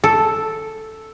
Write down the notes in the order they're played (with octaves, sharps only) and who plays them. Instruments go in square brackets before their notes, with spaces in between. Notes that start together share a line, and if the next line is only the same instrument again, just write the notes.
[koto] A4